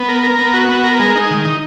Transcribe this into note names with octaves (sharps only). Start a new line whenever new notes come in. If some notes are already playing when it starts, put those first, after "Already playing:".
Already playing: B3
A#4
A#4
B3
F#4
B3
A#4
G#3
D#4
D#3
D#4